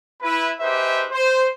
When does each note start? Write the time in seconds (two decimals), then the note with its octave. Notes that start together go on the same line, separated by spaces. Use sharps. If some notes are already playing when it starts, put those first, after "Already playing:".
0.22 E4 B4
0.60 D#4 G4 G#4 B4 C5 E5
1.11 C5